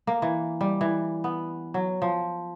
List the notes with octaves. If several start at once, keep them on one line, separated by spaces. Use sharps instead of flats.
A#3
E3
G3
E3
B3
F#3
F3